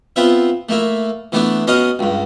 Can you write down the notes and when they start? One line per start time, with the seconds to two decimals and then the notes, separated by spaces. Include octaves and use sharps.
0.16 B3 C4 F4 B4 E5
0.69 A3 A#3 E4
1.32 E3 A3 B3 D4 E4
1.67 B3 C#4 F#4 D#5 F5 D#6
1.99 C#2 G2